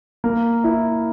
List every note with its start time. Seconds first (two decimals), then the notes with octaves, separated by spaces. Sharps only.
0.24 A#3
0.64 E4